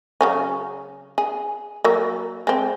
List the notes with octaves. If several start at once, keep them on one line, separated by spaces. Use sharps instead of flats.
C#3 F#3 C#4
G#4
F#3 A#3
G#3 C4